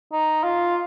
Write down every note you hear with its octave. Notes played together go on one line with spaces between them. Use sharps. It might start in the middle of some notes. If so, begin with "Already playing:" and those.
D#4
F4